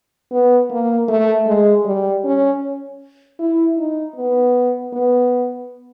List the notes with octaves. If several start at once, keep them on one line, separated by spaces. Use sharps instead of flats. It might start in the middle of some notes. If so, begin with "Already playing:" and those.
B3
A#3
A3
G#3
G3
C#4
E4
D#4
B3
B3